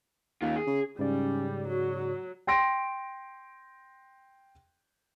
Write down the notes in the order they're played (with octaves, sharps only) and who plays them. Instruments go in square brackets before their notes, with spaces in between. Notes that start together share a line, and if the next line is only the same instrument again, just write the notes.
[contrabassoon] D#2 [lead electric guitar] C#3 F4
[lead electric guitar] G#4
[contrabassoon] C#3
[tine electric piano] G#2 C#3 D5 [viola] G3 [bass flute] C#4
[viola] F#3 [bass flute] F#4
[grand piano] G5 C6 A#6 D7